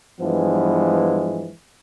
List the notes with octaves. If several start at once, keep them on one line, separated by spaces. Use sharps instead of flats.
G2 E3 F3 G#3 B3